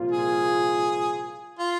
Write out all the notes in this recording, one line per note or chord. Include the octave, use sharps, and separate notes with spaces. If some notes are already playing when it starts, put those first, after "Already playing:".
Already playing: C2 A#2 F3 A#3 F4
G#4
F4